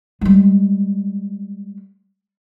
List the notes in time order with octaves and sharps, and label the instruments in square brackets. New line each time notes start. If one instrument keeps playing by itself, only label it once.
[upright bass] G3 G#3